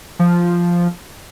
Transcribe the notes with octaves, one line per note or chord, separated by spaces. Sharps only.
F3